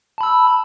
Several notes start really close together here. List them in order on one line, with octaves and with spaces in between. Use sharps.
A5 B5 E6